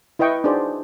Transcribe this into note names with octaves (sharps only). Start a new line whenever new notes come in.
E4 B4 D#5 G5 C#6
D4 D#4 F#4 G#4 C5 D5